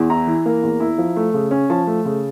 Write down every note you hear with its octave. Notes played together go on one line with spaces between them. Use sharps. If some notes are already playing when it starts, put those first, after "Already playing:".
Already playing: E2
E4 A#5
E3
A#3
E2
E4
F3
A3
C#3
C#4
F3 A5
A3
C#3